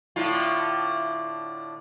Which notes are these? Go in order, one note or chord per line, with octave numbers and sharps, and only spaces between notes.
A2 D3 F4